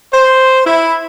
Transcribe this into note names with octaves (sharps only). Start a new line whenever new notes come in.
C5
E4